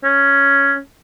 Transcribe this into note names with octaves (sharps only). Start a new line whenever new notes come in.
C#4